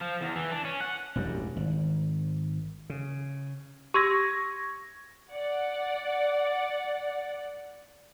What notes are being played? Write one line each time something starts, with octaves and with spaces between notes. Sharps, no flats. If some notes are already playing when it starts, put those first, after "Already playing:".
F3
E2
E3
D4
C#4
F#5
E1 A1 F#2 G3
G#1
C#3
G4 C6 C#6 E6 G#6 A#6
D5 F#5